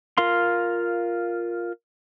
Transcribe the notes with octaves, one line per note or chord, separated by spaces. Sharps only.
F4 A#4 F5 C6